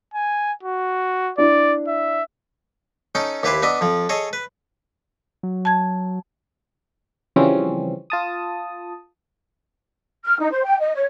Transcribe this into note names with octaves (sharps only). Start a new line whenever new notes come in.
G#5
F#4
D4 E4 D5
E5
C#4 D#4 A4 G5
D#2 E4 G4 B4 C5 B5
B3 D4 D#5 E5
F2 F3
G#4 A4 C#5 D#5
B4
F#3
A5 G#6
C#3 E3 F3 G3 C4 C#4
F4 A5 D#6
F6
D#4
C5
G5
D#5
C#5